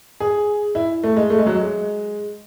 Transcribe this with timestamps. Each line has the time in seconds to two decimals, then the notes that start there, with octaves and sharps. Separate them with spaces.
0.20 G#4
0.75 E4
1.04 A3
1.17 G#3
1.30 A3
1.39 G#3
1.46 F#3
1.55 G#3